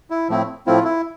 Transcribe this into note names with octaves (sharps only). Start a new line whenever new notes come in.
E4
A2 F3 A3 C4 E4
A2 F3 A3 C4 E4 F4
E4